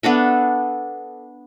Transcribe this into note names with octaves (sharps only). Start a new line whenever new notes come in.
B3 D4 A4 E5